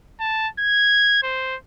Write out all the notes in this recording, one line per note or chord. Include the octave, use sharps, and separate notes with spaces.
A5
G#6
C5